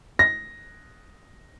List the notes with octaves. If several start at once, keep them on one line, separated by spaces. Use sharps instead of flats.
A#6